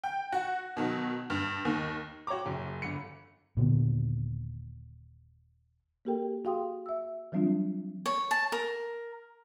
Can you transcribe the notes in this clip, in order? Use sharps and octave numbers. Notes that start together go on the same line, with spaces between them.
G5
F#4
B2 D#3 F#3
G2
D#2 D#3
F#4 C#5 G5 A#5 D6
F#1 F#2
G1 D3 B5 C#7
D#1 A#2 D3 B3
A#3 F#4 G4 A4 A#4 G5
F#4 G#4 F5 G5 C6 D#6
E5 E6
E3 F#3 G3 C4 D4 F4
C#5
A5
A#4